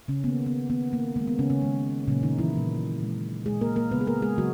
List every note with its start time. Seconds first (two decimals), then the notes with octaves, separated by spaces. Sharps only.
0.08 C#3 C#4
0.24 D#3 A#3 B3
0.46 B3
0.70 D#3 A#3 B3
0.93 A#3
1.16 D#3 G#3 A#3
1.27 B3
1.39 C#3 C#4
1.50 C#3 C#4
1.62 D#3 G#3
2.07 A#2 C#3 F#3 A#3 C#4
2.23 D#3 D#4
2.38 E3 E4
2.54 A#2 F#3 A#3
3.00 A#2 G#3
3.46 A#2 G#3 G#4
3.61 A#3 A#4
3.76 A#3 A#4
3.91 C#3 G#3 B3 B4
4.01 G#4
4.07 A#3 A#4
4.22 G#3 G#4
4.38 C#3 F#3 F#4